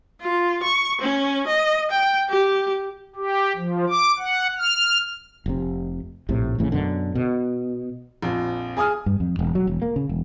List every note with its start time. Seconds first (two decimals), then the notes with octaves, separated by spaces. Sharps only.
0.21 F4
0.63 C#6
1.01 C#4
1.47 D#5
1.91 G5
2.29 G4
3.16 G4
3.56 F3
3.90 D6
4.19 F#5
4.58 F6
5.46 F1 C3
6.29 A#1 A2 C3
6.58 A1 F2 A2 C#3
6.72 F#2 B2 D3
7.15 B2
8.22 A#1 F2
8.77 G#4 G#5 D#6 F6
9.06 G2
9.20 F2
9.39 E1
9.55 F#3
9.67 E1
9.82 A#3
9.96 C#3
10.09 E1